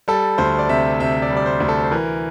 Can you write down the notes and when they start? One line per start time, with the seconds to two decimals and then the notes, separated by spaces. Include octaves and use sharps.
0.08 G3 A4
0.38 D2 C5
0.59 D5
0.69 C3 E5
1.00 C3 E5
1.22 D5
1.30 G3
1.36 D5
1.46 C5
1.60 D2
1.69 A4
1.84 C5
1.91 E3 A#4